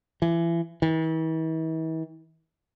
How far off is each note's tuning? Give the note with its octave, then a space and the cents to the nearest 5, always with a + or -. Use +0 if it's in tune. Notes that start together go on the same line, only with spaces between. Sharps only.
E3 +30
E3 -45